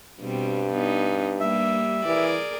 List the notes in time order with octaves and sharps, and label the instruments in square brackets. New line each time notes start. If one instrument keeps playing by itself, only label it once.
[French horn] G2 [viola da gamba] B2 G3 C4
[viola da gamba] B3 D#4
[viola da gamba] G3 A#3 [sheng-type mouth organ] E5
[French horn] E3 [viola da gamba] G#4 A#4 D5